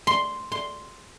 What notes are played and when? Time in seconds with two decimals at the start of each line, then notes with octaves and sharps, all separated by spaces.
0.07 C6
0.52 C6